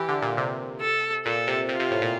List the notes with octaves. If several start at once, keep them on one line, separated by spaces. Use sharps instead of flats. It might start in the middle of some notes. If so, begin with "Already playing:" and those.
Already playing: E3 G4
D3
A#2
C3
A4
A#2 A4
C3
C3 F4
C3
A2
A#2